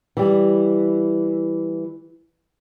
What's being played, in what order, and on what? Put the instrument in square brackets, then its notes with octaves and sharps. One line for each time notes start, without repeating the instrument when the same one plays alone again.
[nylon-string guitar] E3 G3